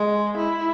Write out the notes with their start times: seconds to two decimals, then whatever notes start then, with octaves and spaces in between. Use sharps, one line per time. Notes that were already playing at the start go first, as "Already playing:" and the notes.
Already playing: G#3
0.37 E4